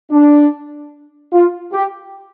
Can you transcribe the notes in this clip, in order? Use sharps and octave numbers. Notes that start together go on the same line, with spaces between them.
D4
F4
G4